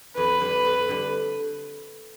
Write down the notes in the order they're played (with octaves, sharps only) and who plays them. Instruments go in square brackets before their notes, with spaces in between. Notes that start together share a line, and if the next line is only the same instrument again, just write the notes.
[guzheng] F2 [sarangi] B4
[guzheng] D3 G3
F2
D3 G3